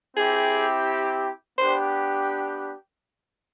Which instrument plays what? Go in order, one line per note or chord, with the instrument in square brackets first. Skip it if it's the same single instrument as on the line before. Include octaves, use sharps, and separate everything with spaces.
[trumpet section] C4 E4 G4 [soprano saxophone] G#4
[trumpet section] B3 D4 G4 [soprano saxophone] C5